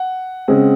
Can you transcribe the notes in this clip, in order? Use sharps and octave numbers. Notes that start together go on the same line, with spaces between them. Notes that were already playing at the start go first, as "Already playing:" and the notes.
Already playing: F#5
C#3 G#3 C4